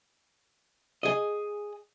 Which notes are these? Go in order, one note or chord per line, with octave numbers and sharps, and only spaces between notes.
G#4 D#5